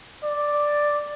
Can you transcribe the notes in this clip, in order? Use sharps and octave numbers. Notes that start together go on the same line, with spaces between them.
D5